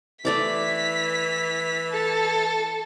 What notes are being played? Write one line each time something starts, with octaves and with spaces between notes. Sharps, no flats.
E3 A3 D5 D6 B6
A4